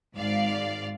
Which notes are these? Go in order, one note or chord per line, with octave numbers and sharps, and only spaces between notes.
G#1 G#2 D5 F5